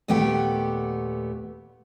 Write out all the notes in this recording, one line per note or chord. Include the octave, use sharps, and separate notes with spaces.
D#2 A#2 A3 B3 G4 F#5